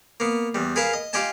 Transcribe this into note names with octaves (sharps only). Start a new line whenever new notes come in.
A#3 B3
E2 G3
G#4 A#4 B4 F5 A5
D#5
F4 G4 D5 D#5 G#5 A5